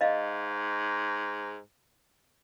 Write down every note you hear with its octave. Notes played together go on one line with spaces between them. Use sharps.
G#2 D#5 F5